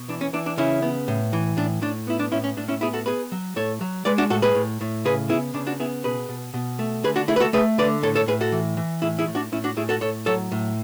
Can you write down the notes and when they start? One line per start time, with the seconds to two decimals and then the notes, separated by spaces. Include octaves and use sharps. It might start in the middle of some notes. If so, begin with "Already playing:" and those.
Already playing: B2
0.09 E3 D4
0.21 C#4
0.33 E3 D4
0.46 D4
0.58 C#3 C#4 E4
0.82 B3
1.08 A2
1.33 E3
1.57 A2 D4
1.82 A2 D4
2.07 B3 E4
2.19 D4
2.32 A2 C#4 E4
2.44 C#4
2.57 A2 D4
2.68 C#4 E4
2.81 B3 E4 G#4
2.93 F#4 A4
3.06 B3 G#4 B4
3.32 F#3
3.56 A2 A4 C#5
3.81 F#3
4.05 G#3 B4 D5
4.18 D4 F#4
4.30 A2 F#4 A4
4.42 G#4 B4
4.55 A2
4.81 A2
5.05 C#3 G#4 B4
5.29 B3 E4 G#4
5.54 C#3 D4
5.67 D4 F#4
5.80 B3 E4 G#4
6.04 B2 G#4 B4
6.29 B2
6.54 B2
6.79 A3
7.04 D3 G#4 B4
7.16 D4 F#4
7.28 A3 E4 G#4
7.36 B4
7.40 F#4 A4
7.53 A3 G#4 B4
7.78 D3 B4 D5
8.03 A2 A4 C#5
8.15 A4 C#5
8.27 A2 G#4 B4
8.41 F#4 A4
8.52 E3
8.77 E3
9.02 A2 E4 G#4
9.19 E4 G#4
9.27 A2
9.35 D4 F#4
9.52 A2 C#4 E4
9.64 D4 F#4
9.77 A2 E4 G#4
9.89 F#4 A4
10.01 A2 A4 C#5
10.26 F#3 A4 C#5
10.52 A2